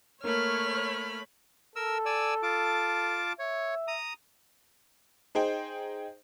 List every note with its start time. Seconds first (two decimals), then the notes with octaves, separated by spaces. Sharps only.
0.24 A3 A#3 C#5 B5 F6
1.76 A4 A#4 E6
2.06 D5 G#5 E6
2.43 F4 A5 D6
3.39 C#5 E5
3.88 A#5 D#6
5.35 D#4 G#4 C5 G5